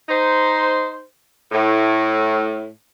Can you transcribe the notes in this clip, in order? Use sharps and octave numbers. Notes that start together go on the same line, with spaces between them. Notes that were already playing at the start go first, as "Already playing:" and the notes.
D#4 C5
A2